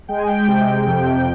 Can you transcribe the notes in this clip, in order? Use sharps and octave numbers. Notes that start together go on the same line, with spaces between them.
G#3 G5
G#5
G5
C3
F2